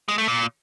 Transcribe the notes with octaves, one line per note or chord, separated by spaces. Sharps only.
G#3
A3
A#2